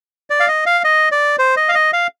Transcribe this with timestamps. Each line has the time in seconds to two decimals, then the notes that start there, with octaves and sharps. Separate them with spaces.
0.30 D5
0.40 F5
0.48 D#5
0.66 F5
0.84 D#5
1.12 D5
1.39 C5
1.57 D#5
1.69 F5
1.75 D#5
1.93 F5